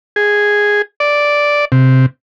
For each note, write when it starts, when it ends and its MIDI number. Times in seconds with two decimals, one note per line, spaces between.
0.16 0.82 68
1.00 1.65 74
1.72 2.06 48